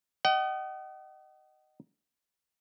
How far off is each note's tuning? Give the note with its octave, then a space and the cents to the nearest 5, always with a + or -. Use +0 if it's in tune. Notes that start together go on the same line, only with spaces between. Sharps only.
D#5 -10 F#5 +45